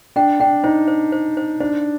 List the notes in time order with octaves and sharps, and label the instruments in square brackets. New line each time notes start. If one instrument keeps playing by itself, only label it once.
[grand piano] D4 [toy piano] G5
[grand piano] D4 [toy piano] G5
[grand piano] D#4 [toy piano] C5
[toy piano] C5
C5
C5
[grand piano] D4 [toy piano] C5